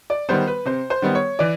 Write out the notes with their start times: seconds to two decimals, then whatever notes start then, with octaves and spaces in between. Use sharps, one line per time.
0.10 D5
0.29 D#3 G3 B3 C5
0.47 B4
0.65 C3 C5
0.90 C5
1.02 D#3 G3 B3
1.15 C#5
1.39 E3 D5